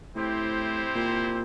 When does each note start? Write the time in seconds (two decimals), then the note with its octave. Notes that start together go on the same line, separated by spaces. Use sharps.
0.15 A2 C4 E4 G4 C5
0.96 A#2